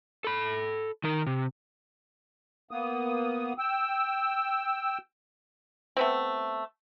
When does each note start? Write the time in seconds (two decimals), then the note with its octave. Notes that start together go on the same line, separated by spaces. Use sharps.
0.24 A4 B5
1.04 D#3 A#4
1.27 C3
2.71 A#3 B3 D#6
3.58 G5 E6
5.97 A3 B3 C4